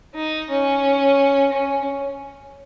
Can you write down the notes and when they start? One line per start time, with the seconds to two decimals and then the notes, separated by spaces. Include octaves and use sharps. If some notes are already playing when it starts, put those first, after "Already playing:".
0.15 D#4
0.49 C#4
1.52 C#4